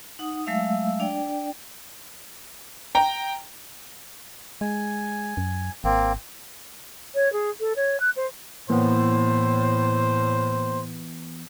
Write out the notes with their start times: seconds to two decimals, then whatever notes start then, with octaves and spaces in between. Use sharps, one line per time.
0.19 D#4 F#5 D#6
0.46 F#3 G#3 A3 E5 F5 E6
1.00 D4 D5 G5
2.95 G5 A#5
4.61 G#3 G#5
5.37 F#2
5.84 G#1 A#3 C4
7.14 C#5
7.32 G#4
7.60 A4
7.76 C#5
8.00 F#6
8.16 C5
8.70 A2 E3 A#3 B3 C5